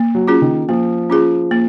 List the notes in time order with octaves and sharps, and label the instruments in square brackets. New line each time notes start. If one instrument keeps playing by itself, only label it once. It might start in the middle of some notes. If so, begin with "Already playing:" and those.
Already playing: [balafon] A#3
[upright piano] F#3
[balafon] C#4 F4 G#4
[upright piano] D#3
[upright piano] F3 [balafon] A#3
[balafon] C#4 F4 G#4
A#3